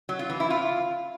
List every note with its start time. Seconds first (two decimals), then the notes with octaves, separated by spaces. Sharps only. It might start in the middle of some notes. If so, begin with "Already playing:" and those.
0.09 F#3
0.19 F4
0.30 E3
0.40 E4
0.50 F4